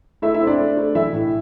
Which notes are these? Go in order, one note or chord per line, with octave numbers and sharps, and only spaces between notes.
A3 E4 E5
E4 E5
C4
D4 D5
A3
A3
E3 E4 E5
A2